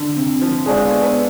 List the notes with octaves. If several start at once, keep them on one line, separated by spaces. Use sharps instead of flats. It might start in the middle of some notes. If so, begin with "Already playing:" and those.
Already playing: D3
C3
F3
F3 G#3 A3 D4 G#4
B3
B3